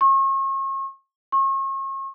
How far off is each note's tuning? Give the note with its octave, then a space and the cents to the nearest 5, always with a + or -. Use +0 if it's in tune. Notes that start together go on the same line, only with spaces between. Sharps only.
C#6 -40
C#6 -40